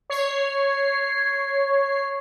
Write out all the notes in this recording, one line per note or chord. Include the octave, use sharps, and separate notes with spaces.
C#5 C7